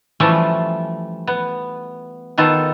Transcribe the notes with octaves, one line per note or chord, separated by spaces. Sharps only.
E3 F3 G3 A3 C#4 F4
B3
D#3 B3 F4 A4